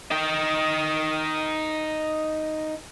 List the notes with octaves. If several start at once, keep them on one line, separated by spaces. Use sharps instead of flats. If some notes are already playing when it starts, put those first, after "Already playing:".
D#4 G5